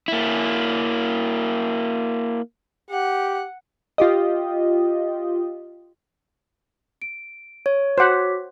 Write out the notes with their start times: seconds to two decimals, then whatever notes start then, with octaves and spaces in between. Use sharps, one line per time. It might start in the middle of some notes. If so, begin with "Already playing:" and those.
0.08 A#3 E4
2.91 G4 F#5
3.98 F4 G4 D#5
7.02 D7
7.66 C#5
7.98 F#4 C5 F#5 D6 B6